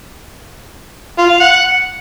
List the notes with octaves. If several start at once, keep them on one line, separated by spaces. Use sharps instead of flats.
F4
F5
F#5